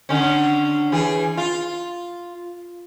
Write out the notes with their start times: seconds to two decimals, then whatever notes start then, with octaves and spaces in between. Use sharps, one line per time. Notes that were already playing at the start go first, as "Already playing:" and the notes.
0.09 D3 C#4
0.92 E3 G#4
1.38 F4